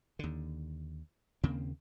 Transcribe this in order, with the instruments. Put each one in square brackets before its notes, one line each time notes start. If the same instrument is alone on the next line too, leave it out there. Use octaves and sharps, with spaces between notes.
[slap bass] D#2 D3
D#2 C#3 A#3 C4